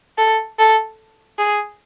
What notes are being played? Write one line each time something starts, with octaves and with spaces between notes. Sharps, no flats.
A4
A4
G#4